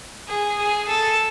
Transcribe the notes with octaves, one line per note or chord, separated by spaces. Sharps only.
G#4
G#4
A4